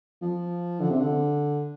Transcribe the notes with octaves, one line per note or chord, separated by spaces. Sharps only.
F3
D3
C3
D3